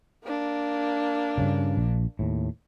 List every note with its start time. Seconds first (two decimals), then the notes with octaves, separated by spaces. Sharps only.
0.25 A#3 D4
1.38 G2 C#3
1.77 A#1
2.19 D#2 A2